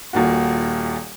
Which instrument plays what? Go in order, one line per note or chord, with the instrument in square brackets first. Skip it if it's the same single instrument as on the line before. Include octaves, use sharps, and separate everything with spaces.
[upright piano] D#1 A#2 F#4